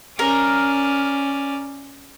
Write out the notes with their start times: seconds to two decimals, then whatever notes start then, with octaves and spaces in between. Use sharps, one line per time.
0.19 C#4 A#4 D5